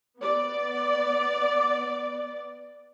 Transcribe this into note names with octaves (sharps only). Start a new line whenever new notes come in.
B3 D5